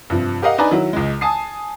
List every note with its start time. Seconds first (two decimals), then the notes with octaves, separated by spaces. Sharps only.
0.10 G2 C3 F3
0.42 G4 A#4 D#5 F5 F#5
0.58 D4 D#4 B4 D5 G#5 A#5
0.71 D#3 F#3 E4
0.93 C#2 G#3
1.21 G#5 A5 D#6 C7